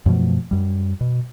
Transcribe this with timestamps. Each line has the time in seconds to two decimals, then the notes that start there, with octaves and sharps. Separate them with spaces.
0.06 F#2 B2 F3 A3
0.51 F#2 G3
1.01 B2